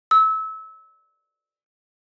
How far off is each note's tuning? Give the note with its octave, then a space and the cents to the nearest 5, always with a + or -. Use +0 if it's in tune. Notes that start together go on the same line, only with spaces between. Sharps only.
E6 -25